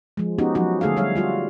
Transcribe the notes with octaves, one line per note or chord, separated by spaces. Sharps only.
F3 G#3
B3 C#4 D#4 F#4 G4
F3 F#3 D#4 F#4
D3 A3 G#4 A4 F5
G3 C#5 F5
G3 F4 F#4